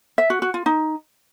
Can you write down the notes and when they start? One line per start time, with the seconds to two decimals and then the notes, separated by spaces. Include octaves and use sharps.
0.18 E5
0.30 F#4
0.42 F#4
0.54 F4
0.66 D#4